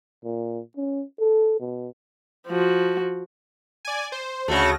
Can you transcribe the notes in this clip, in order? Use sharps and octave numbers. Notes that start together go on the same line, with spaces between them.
A#2
C#4
A4
B2
F3 F#4
D5 G#5
C5
D2 C#3 A3 F#4 A#6